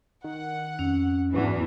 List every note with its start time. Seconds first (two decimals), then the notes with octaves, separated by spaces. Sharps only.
0.24 D#3 F#5
0.79 F2 C#4
1.34 E2 G#2 E3 D4 F#4 B4